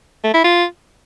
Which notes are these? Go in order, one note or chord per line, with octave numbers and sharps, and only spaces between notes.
A3
E4
F4